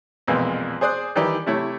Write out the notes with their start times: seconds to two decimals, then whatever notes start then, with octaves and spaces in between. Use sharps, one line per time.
0.28 B1 F2 A#2 E3 F3 G#3
0.81 G#4 C5 D5 D#6 F#6
1.16 D#3 E3 G3 E4 G4 D5
1.46 C3 A3 E4 G4 C#5